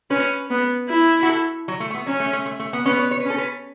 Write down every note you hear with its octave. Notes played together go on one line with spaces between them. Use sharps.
C#4 B4
B3
E4
F#4
A4
F#3
A3
A3
B3
F#3 C#4
A3
A3
A3
A3
B3
B3 C#4
C#5
C#5
B4
C#4 A4
B4